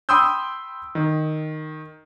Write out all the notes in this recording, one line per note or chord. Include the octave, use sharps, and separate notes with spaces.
G5 B5 C6 D#6 E6 G6
D#3